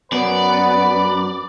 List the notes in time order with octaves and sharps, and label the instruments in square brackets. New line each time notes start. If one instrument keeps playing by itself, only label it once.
[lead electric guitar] F#2 [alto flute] B3 [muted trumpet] B4 [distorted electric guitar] D5